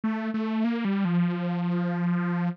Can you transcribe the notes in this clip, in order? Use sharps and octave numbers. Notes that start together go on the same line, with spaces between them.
A3
A3
A#3
G3
F3